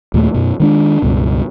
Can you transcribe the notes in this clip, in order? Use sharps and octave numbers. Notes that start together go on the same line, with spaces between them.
D#2 A#2 G#3 A3
F#2 B2
D#3 G#3 D4
C#2 G2 B2